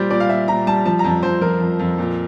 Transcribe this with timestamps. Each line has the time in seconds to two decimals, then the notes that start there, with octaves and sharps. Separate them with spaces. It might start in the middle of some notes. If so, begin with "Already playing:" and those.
Already playing: A#2 G3 C5 D5
0.10 A#2 D5
0.20 F5
0.29 A#2 E5
0.48 A#2 A#5
0.67 G3 A5
0.85 F3 A5
0.99 A#5
1.04 F2 A5
1.23 F2 C5
1.41 F3 A#4
1.61 F2
1.79 F2
1.98 A#2